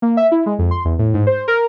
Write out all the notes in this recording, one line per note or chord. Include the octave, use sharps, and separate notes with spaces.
A#3
E5
E4
G#3
F2
C6
E2
A2
G#2
C5
A#4